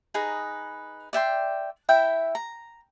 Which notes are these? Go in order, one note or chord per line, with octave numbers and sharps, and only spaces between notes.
D#4 G#4 B4 A#5
D5 E5 G5 C6
E4 E5 G5
A#5